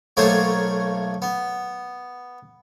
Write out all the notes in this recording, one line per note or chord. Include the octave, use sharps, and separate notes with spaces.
B1 A3 A#3 F4 C5 C#5
B3